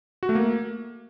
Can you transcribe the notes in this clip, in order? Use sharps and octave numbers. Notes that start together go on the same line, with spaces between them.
F#4
A3
A#3